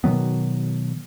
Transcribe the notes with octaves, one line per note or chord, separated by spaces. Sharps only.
B2 D#3 F#3 B3